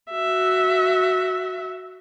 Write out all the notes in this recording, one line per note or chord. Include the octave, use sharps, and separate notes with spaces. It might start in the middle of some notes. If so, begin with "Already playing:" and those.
F#4 E5